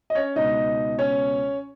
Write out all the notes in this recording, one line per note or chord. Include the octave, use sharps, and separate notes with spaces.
D#5
C#4 C#5
C#2 B2 D#4 D#5
C#4 C#5